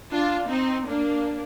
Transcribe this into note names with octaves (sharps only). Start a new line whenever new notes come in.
D4 F4
C4 D#4
A#3 D4